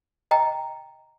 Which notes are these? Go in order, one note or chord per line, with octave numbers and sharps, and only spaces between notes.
D#5 G5 A#5